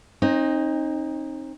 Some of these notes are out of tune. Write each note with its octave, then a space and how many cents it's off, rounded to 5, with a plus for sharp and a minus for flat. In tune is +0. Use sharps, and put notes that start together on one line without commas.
C4 +45 D#4 +0